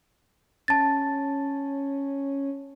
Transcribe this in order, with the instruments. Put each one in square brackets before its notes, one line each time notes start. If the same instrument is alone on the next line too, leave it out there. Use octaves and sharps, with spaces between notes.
[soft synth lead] C#4 [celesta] A5 A6